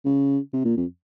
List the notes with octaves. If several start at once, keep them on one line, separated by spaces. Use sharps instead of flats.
C#3
C3
A#2
F2